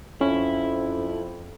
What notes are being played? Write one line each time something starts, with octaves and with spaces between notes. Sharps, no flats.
F2 C#4 E4